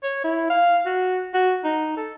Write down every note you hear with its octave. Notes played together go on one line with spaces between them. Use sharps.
C#5
E4
F5
F#4
F#4
D#4
A4